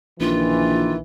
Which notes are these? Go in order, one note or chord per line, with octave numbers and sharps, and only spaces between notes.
A#1 D#3 E3 F4